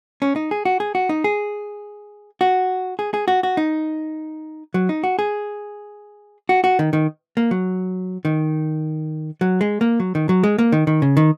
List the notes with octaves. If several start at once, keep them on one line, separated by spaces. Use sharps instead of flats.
C#4
D#4
G#4
F#4
G#4
F#4
D#4
G#4
F#4
G#4
G#4
F#4
F#4
D#4
F#3
D#4
F#4
G#4
F#4
F#4
D#3
D#3
A#3
F#3
D#3
F#3
G#3
A#3
F#3
D#3
F#3
G#3
A#3
D#3
D#3
C#3
D#3